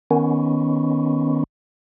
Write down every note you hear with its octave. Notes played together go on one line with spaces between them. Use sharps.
D#3 B3 C#4